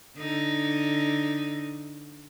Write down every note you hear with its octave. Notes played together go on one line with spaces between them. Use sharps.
D3 D#4